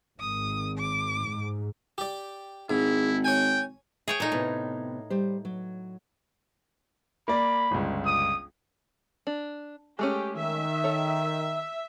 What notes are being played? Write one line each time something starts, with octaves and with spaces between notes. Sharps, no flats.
G#1 D#6
D6
G#2
G4 D5
G#1 G#2 E4
C#5 G5 G#5
G#4 C#5 E5 G5
A#2 D#4 A4
A2 C3 B3
G3 C5
F#3
A#3 D5 B5
G1 C#2
D#6
D4
G#3 A3 C#4 G4
D#3 E5
A4 C#5